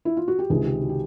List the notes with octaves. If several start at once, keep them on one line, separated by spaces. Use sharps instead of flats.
E4
F4
F#4
G4
C#2 C3 D#3 G#4
G4
F#4
G4